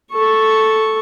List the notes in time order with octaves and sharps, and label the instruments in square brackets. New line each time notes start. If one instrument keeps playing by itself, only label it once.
[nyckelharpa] A4 C#6